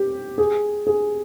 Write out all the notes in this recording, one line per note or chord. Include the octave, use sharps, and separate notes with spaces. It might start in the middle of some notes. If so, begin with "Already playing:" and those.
Already playing: G4
G#4
G#4